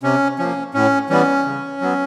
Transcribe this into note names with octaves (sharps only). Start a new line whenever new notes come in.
C3 C#4
F3 A#3 C#4
A2 C#4
E3 G3 B3 C#4
C#3
F#3 B3